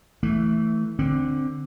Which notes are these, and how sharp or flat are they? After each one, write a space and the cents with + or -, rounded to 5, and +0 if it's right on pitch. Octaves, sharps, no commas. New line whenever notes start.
E3 -10 A3 +0
D3 +0 C4 +10